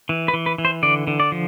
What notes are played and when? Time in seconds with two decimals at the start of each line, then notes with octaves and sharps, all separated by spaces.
0.09 E3
0.28 B4
0.34 E3
0.46 B4
0.58 E3
0.65 C5
0.83 D3 D5
1.07 D3
1.20 D5
1.32 F3